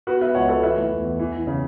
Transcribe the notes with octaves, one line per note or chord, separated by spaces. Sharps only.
B3 F#4 B4
B3 B4 E5
C#2 C#5 F#5
B3 A4 C#5
E3 B4 E5
A3
E2
E2
E3
E3
C#3